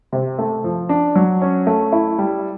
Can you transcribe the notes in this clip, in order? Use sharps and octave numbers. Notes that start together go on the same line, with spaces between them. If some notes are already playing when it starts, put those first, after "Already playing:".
C3
A3
F3
D4
F#3
C#4
A3
E4
G3